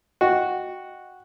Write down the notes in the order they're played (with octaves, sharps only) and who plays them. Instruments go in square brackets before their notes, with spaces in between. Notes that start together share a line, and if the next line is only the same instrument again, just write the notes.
[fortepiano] F#4 [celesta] D#5 G5